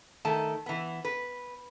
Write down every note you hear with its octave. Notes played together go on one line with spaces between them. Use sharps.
D#3 A3 A5
E3 B3
B4